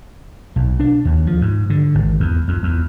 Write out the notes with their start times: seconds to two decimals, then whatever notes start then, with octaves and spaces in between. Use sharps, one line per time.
0.56 B1
0.80 D4
1.05 D#2
1.27 F3
1.42 G#2
1.70 D3
1.95 G#1
2.20 E2
2.48 F2
2.63 E2